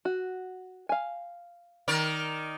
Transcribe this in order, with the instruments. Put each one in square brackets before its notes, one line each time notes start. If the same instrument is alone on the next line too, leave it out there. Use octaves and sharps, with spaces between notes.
[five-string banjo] F#4
F5 G#5
[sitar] D#3 A#4 D5